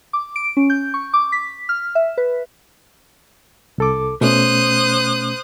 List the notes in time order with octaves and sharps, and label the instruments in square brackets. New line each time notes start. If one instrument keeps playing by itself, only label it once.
[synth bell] D6
D7
C#4
G6
C#6
D6
B6
F6
E5
B4
[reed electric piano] C2 A4 D6
[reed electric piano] B2 A3 C#4 [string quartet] C5 D#6 F#6